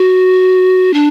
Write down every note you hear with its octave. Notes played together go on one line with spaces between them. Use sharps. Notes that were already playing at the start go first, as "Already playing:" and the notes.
Already playing: F#4
D4